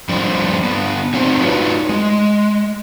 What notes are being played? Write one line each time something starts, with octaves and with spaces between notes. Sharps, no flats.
F3 G3 D4 C5 D5
D3 B3
F#3 C4 D4 D#4 C5
D4 D#4 F4 F#4 B4 C#5
G#3